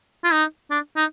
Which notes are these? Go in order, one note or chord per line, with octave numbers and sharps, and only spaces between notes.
F4
D#4
D4
D#4